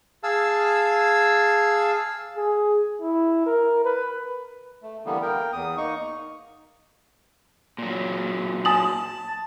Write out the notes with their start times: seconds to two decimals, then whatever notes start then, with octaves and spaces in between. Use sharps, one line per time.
0.23 G#4 F5 A5 E6
2.37 G#4
3.01 E4
3.46 A#4
3.84 B4
4.82 A3
5.06 D3 E3 G3 A#3 B3
5.22 A#3 A#4 G5
5.53 E2 D#6
5.77 A#3 D#4 C#6
7.78 A#2 F#3
8.65 G#5 A5 D#6 F#7